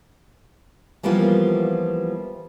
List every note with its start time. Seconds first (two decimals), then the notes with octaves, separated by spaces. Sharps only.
1.03 E3 F3 G3 A#3 B3 F4